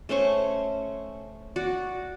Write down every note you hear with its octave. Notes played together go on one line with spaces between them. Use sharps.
A3 C#4 C5 C#6
F#4 D5